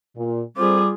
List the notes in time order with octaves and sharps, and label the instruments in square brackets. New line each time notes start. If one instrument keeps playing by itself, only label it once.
[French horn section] A#2
[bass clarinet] G3 [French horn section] C4 A4 C5 [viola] F4 G#4 [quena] D6